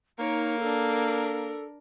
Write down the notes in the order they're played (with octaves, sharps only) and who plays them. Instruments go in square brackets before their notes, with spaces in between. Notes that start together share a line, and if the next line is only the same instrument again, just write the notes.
[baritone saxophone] A#3 [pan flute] D#4 [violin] A#4 C#5
[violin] D4 A#4 [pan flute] A4